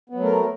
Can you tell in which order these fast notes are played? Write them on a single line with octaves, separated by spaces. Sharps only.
B3 F#3 A3 A#4